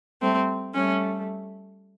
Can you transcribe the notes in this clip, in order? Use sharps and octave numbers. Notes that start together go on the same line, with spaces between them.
G3 A3 C4
G3 A3 C#4